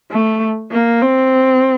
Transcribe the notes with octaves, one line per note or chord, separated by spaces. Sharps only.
A3
A#3
C4